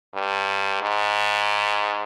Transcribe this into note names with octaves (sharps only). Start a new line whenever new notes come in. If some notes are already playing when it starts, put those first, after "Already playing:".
G2
G#2